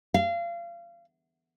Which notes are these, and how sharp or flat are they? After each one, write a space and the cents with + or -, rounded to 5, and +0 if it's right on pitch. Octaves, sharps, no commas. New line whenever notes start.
F5 -30